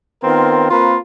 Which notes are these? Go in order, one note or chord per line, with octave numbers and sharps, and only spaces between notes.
D#3 B3 C4 F4 A#4
A#3 C4 F4 A#4 B4